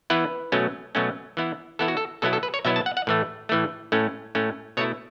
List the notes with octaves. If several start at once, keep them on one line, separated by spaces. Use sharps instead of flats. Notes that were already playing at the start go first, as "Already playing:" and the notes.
E3 B3 E4 B4
B2 F#3 A3 C#4
B2 F#3 A3 C#4
E3 B3 E4
E3 B3 E4 A4
F#4
A4
B2 F#3 B3 E4 A4
A4
B4
C#5
B2 F#3 B3 E4 E5
A5
F#5
F#5
A2 E3 A3
A2 E3 A3
A2 A3 C#4
A2 A3 C#4
B2 A3 E4 C#5